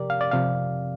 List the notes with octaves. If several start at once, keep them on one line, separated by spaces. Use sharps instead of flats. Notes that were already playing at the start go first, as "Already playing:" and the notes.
Already playing: C3 F3 G4 A#4 D5
F5
D5
C3 F3 F5